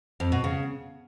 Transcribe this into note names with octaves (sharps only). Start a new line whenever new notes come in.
F2
B2
C#3